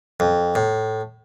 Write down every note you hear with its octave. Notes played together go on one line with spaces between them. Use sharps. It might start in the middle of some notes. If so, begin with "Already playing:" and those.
F2
A2